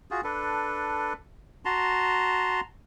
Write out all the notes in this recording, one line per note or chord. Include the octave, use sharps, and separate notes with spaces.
F4 F#4 G#4
D4 A4 B4
F#4 A5 A#5 C6